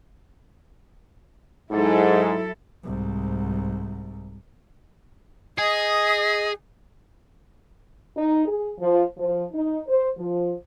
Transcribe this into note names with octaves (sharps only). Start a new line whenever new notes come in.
G#2 F#3 E4 A4
C2 G#2
G#4 D#5
D#4
G#4
F3
F3
D#4
C5
F3